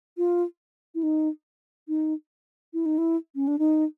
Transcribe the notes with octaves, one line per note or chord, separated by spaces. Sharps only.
F4
E4
D#4
D#4
E4
D#4
E4
C#4
D4
D#4